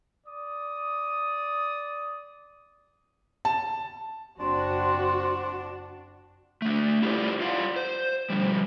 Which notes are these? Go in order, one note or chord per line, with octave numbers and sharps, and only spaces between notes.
D5 D#6
A5
F#1 C4 D4 F#4 C6
A3 D4
E4 F4 G4 A4 C5 D5
F4 D5 F5 F#5
C5
B2 D3 F3 G3